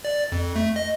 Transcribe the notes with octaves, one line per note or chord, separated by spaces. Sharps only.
D5
F2
A3
D#5